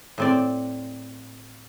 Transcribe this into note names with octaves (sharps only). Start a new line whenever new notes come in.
A2 C4 D5